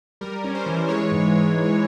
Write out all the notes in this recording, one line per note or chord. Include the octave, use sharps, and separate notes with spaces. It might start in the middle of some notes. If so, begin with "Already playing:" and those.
G3 A#4
C#4
C5
E3
G#3 C#5
G#2